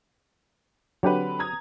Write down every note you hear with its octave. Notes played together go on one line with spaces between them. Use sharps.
D3 F#3 C4 G4 B4 F#5
A#5 D#6 G#6